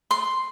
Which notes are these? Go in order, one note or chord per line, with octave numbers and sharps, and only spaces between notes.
C6